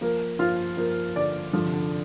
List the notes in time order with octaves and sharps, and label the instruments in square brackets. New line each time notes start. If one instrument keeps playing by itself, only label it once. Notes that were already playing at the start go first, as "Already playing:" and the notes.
[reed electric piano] F3 [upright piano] A#3
[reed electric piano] F3 [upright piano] F4
[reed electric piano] F3 [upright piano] A#3
[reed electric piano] D3 [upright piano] D5
[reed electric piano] D3 [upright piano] F3
[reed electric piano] C3
D3